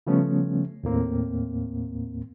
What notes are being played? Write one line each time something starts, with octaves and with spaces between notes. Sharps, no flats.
C#3 F3 G3 A3 B3 C#4
D#2 A2 A#3 C4